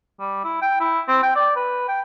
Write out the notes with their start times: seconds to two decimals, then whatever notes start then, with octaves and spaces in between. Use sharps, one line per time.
0.19 G3
0.44 E4
0.62 G5
0.80 E4
1.08 C4
1.23 G5
1.36 D5
1.56 B4
1.88 G5